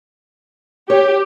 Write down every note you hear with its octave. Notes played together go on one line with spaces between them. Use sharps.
G4 C#5